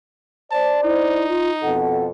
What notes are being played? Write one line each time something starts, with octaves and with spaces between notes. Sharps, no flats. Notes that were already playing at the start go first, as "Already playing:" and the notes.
C5 D5 A5
D#4 E4
F4
F2 B2 A4 F#5